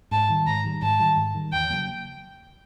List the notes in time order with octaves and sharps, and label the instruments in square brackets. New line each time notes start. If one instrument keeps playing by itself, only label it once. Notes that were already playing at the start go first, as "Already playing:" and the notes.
[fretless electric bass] G#2 [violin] A5
[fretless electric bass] D#3 G3
[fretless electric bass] G#2 [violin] A#5
[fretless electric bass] D#3 G3
[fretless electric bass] G#2 [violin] A5
[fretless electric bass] D#3 G3
G#2
D#3 G3
[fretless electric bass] E2 [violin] G5
[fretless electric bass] C#3 F#3 A#3